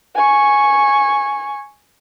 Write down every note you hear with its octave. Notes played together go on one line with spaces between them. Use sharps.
G#5 C#6